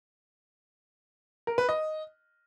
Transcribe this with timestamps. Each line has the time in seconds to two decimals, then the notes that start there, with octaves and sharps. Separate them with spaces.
1.47 A#4
1.58 B4
1.69 D#5